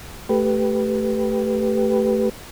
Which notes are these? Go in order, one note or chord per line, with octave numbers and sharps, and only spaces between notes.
A3 G4 B4